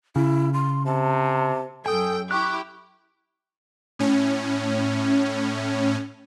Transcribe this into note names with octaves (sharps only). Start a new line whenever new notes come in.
C#3 E4
C6
C3 A5
F#2 A4 G5 G#5 D#6
E4 G4 C#6 F#6
A2 C#4